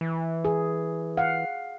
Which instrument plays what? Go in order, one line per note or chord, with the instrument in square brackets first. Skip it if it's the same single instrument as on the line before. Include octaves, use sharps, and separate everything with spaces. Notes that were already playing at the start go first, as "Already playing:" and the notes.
[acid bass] E3
[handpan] G#4
F5 F#5